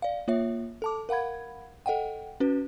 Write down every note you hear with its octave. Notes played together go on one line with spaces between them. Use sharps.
D5 F5
A#3 F4 C#5 E5
A4 A5 D6
A#4 F5 F#5 B5 G#6
A4 D#5 F#5 G5
C#4 F#4 B4